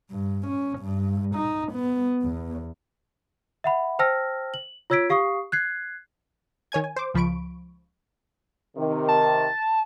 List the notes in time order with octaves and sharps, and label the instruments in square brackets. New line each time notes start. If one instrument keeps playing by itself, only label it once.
[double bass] G2
C#4
G2
D#4
B3
E2
[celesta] E5 F#5 B5
C5 G5 A5 E6 F6 A#6
F#7
F4 C#5 E6 G#6 B6 D7
G4 F5 C#6 D#6 C7
F#6 G#6 C7
[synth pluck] D#3 C#5 G#5 G#6
G#5
C5 D6
C#2 F3 B5 C#6 D7
[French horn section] C3 D#3
[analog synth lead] A5